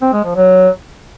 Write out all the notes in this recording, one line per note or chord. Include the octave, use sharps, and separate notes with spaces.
C4
G#3
F3
F#3